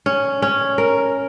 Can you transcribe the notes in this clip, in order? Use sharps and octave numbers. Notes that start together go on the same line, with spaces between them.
C#4
C#4
A#4